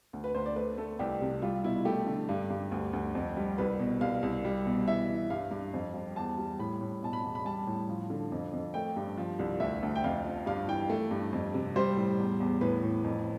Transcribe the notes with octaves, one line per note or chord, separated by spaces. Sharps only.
D2
B4
D2 C5
D5
A3 B4
A3 A4
C2 G4
C3
G3 F4
B2 E4
A3 G4
D3
G2
G2
D2
D2
F2
G3
C2 B4
B2
C2 F5
C2
G3
B2
E3 E5
E3
G2 F5
G2
F2
G3
E2 A5
G3
A2 B5
A2
B2 A5
B5
E2
B5
G3 A5
A2
F3
D3
F2
F2
A3 G5
G2
F3
C2
D2 E5
D2
G5
F2 F5
F3
G2 F5
E3 G5
A3
G2
F2
C3
G3 C5
A2
E2
E2
A2 B4
A2
F2